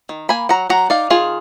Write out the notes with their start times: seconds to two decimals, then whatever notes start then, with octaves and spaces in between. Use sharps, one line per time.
0.09 D#3
0.29 A#3 G#5 B5
0.49 F#3 F#5 A#5
0.69 F#3 F#5 A#5
0.90 D#4 D5 F5
1.10 D#3 F4 G#4